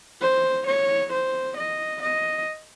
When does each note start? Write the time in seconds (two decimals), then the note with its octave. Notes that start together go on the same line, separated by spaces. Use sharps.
0.21 C5
0.66 C#5
1.12 C5
1.56 D#5
2.02 D#5